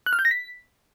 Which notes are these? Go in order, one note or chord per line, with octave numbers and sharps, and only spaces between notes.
F#6
F6
G6
A#6
B6